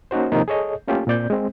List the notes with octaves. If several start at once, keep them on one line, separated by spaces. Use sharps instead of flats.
A#3 C#4 D#4 F#4 C5
C3 D#3 F3 A#3 D#4
G#4 A4 C#5 D#5
A3 A#3 C#4 F4 G4 A4
A#2 C4 D5 G6
G#3 C4